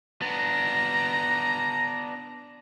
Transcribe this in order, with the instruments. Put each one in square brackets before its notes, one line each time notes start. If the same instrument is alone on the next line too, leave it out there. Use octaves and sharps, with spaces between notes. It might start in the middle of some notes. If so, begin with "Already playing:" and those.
[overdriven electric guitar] B3 D4 [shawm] A#5